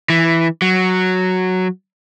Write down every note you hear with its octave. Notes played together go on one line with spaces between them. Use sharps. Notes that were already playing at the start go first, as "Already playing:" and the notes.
E3
F#3